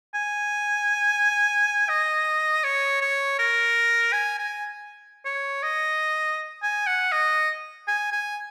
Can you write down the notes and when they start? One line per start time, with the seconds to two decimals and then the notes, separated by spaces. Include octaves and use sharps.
0.14 G#5
1.89 D#5
2.64 C#5
3.01 C#5
3.39 A#4
4.13 G#5
4.39 G#5
5.25 C#5
5.63 D#5
6.63 G#5
6.87 F#5
7.12 D#5
7.88 G#5
8.12 G#5